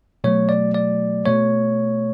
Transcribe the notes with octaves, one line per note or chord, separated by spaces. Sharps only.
B2 F#3 A3 C#5
D5
D5
B2 A3 C#5